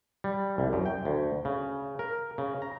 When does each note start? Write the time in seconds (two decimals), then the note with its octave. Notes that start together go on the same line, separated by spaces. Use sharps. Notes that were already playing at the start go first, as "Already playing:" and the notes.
0.24 G3
0.58 C2
0.73 F#2
0.86 G5
1.05 D2
1.45 C#3
1.99 A#4
2.38 C#3
2.62 A#5